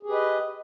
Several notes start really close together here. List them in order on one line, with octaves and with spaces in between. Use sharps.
G#4 G4 B4 D#5